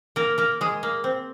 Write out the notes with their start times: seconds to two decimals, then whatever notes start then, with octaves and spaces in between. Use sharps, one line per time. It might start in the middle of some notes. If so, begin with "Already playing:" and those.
0.16 A#3 A#4
0.38 A#3 A#4
0.61 G#3 G#4
0.83 A#3
1.04 C4